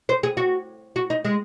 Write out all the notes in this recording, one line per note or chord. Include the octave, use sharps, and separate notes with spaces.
C5
G#4
F#4
F#4
D#4
G#3